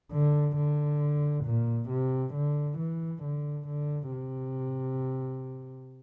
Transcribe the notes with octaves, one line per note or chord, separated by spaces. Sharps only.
D3
D3
A#2
C3
D3
E3
D3
D3
C3